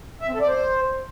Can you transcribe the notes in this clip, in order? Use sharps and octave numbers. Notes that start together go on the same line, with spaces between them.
E5
C4
A4
D5
C5